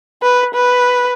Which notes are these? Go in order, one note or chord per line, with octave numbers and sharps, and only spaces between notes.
B4
B4